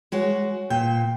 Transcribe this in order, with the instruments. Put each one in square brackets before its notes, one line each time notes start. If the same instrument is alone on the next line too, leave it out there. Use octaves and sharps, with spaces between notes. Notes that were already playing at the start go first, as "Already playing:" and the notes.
[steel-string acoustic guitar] G#3 F#4 C#5
[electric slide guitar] A#2 [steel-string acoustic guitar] G5